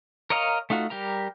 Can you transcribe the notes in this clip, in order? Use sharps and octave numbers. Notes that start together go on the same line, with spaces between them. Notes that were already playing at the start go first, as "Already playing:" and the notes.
A#4 C#5 D#5 F5 A#5
A3 D#4 F4 F#4
G3 G4 A#4 A#5